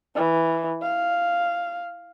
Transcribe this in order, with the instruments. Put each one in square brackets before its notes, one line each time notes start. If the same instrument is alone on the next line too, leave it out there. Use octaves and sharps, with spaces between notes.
[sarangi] E3
F5